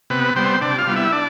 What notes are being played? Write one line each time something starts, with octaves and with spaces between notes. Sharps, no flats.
C3 B3 B4
G3 B3 C4 C5
C3 D4 D5
F4 F5
G3 B3
E4 E5
D4 D5